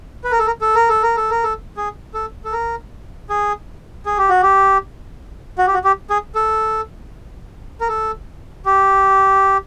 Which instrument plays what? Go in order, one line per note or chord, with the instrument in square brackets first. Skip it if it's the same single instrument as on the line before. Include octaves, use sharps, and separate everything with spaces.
[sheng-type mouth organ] B4
A#4
A4
A#4
A4
A#4
A4
A#4
A4
A#4
A4
G#4
A4
A4
A#4
G#4
G#4
G4
F#4
G4
F#4
G4
F#4
G4
G#4
A4
A#4
A4
G4